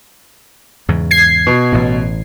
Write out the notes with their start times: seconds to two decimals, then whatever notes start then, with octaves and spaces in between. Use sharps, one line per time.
0.88 E2 G#2 C#3
1.11 G#6 C7
1.47 B2
1.72 A1 A2